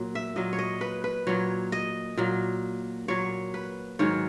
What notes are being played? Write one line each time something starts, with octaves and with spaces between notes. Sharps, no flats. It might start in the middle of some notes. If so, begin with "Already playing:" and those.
Already playing: A#2 F#3
E5
A#2 F#3 D#5
C#5
D#5
B4
B4
A#2 F#3 C#5
D#5
A#2 F#3
A#2 F#3 C#5
B4
G#2 D#3 F#3 C#5